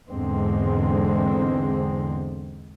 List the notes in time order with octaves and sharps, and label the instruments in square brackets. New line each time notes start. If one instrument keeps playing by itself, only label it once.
[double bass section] E2 G#2 D3 G#3 C4